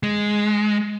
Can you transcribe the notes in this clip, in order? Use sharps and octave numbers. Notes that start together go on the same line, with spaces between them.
G#3